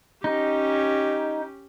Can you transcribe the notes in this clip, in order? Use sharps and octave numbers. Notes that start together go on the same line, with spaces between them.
C#4 D#4 G4